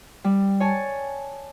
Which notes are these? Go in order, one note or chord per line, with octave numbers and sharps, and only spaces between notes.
G3
C#5 G#5 A5